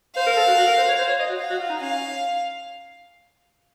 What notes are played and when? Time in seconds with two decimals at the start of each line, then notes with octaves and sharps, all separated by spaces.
0.16 C5 F5
0.26 A#4
0.37 A4
0.47 F#4
0.58 F#4
0.67 A#4
0.78 C5
0.88 C#5
0.99 C5
1.09 C#5
1.19 D#5
1.30 F#4
1.39 F5
1.50 F#4
1.59 F4
1.70 D#4
1.80 C#4 F5